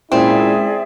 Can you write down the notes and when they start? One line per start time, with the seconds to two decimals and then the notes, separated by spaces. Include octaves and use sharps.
0.12 A#2 G#3 C4 C#4 E4 G#4 D5 E5